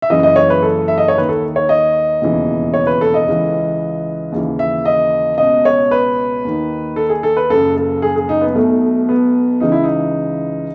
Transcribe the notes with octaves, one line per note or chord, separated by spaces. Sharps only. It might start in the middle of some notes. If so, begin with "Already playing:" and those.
E5
F#1 F#2 C#3 E3 D#5
D#5
C#5
B4
A4
E5
D#5
C#5
D#2 D#3 B4
A4
C#5
D#5
E1 D#2 C#3 E3
C#5
B4
A4
D#5
C#2 C#3 E3
D#2 C#3 E3
E5
D#5
C#2 B2 D#5
C#5
B4
D#2 D#3
A4
G#4
A4
B4
F#1 F#2 C#3 A4
A4
G#4
G#4
D#4
B3
B1 B2 A3
B3
C#2 C#3 E3 D#4
E4
D#4